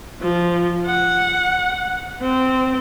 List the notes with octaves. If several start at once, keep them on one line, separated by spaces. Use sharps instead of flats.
F3
F#5
C4